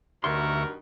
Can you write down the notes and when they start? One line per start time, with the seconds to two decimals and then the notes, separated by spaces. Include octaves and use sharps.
0.24 D2 G2 D#3 F#4 A#4 E5 C6 C#6